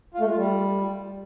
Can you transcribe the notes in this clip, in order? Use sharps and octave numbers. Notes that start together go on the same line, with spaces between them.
F4
A3
G#3
F4
G3